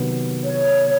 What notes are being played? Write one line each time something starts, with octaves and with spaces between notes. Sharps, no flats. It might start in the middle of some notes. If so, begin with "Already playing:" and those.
Already playing: C3 D#3 F#3 B3
C#5